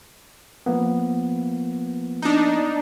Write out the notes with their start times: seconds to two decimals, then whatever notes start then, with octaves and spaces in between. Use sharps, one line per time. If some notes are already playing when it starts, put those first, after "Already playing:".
0.66 F3 A#3 B3
2.22 D4 D#4